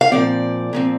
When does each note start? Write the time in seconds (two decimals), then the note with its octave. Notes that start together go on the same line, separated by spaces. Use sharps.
0.01 F5
0.11 A#2 F3 C4 D5
0.73 A#2 F3 C4